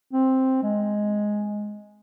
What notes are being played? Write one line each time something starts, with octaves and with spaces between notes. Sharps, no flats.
C4
G#3